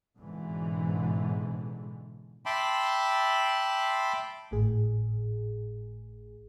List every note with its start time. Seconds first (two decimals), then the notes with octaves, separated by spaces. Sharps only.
0.17 G#1 G#2 B2 D3 E3
2.46 E5 G5 A5 B5 C6 D6
4.51 G#1 A2 G#4